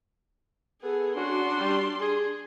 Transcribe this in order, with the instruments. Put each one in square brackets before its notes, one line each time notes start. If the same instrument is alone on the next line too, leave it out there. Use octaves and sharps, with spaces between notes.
[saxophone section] B3 A4 [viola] G#4
[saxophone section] F#3 C#4 F#4 [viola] D4 C6
[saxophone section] G3
G#4